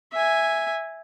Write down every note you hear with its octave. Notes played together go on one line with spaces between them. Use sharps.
E5 G#5